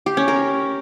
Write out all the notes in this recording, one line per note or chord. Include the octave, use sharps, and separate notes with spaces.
G4
C#4
A#4